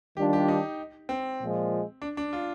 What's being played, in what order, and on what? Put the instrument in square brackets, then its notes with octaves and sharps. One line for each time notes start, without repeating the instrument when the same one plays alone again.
[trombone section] D#3 G3 D4 F4 [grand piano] G4
[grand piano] G4
D#4
C4
[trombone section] A#2 F3 G#3
[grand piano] D4
D4
F4